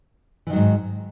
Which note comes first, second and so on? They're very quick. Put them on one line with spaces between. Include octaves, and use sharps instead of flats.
E3 D#3 F#3 G#2